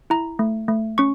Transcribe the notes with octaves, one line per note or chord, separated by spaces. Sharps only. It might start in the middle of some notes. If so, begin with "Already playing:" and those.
E4 A#5
A3
A3
C#4 C#6